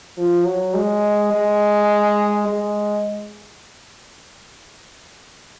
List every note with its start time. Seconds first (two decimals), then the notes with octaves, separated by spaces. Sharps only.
0.18 F3
0.46 F#3
0.74 G#3
1.33 G#3
2.48 G#3